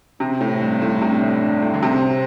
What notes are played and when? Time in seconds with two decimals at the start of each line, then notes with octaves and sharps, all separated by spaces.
0.20 C3 C4
0.41 A2
0.61 G2
0.82 A2
1.01 C3 D4
1.22 A2
1.42 G2
1.62 A2
1.74 D3
1.82 C3 C4